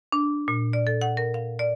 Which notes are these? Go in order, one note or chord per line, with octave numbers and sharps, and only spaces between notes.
D4
A#2
D5
A4
F#5
A#4
F5
D5